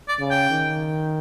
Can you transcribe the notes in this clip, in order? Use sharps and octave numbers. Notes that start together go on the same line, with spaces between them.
D5
C#3
G5
D#3